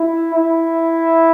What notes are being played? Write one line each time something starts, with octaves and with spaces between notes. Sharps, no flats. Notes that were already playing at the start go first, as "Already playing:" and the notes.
Already playing: E4
E4